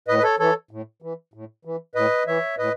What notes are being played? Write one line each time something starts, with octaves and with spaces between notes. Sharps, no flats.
A2 B4 D#5
B4
A4 C#5
E3 A4 C#5
A2
E3
A2
E3
A2 B4 D#5
E3 C#5 E5
A2 B4 D#5